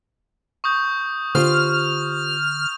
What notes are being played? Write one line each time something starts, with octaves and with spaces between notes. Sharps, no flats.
C#6 D#6 G6
D3 F4 G4 C5 F6